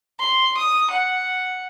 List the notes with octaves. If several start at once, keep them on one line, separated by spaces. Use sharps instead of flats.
C6
D#6
F#5